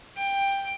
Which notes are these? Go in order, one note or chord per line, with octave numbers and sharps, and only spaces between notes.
G5